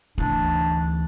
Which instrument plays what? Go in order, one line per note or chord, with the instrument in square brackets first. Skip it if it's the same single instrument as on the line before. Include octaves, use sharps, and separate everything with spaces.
[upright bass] D2 E3 [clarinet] D4